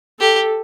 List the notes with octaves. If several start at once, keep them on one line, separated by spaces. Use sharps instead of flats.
G4 A4